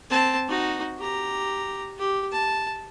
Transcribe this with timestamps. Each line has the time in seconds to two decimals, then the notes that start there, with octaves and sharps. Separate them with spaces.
0.10 C4 A5
0.48 D#4 F#4
0.99 G4 A#5
1.98 G4
2.32 A5